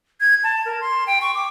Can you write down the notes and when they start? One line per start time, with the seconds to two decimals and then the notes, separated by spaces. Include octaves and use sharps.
0.21 G#6
0.44 A5
0.65 A#4
0.81 C6
1.07 G5
1.22 C#6
1.35 D6